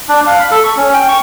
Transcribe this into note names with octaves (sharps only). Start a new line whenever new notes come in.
D4
F5
B5
A4
C#6
C#4
G5
C#6